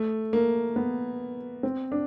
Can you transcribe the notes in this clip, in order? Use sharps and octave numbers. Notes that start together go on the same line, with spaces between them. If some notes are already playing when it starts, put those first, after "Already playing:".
Already playing: A3
A#3
B3
C4
D4